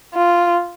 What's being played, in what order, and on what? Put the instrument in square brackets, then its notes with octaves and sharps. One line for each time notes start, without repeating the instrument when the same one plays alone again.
[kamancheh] F4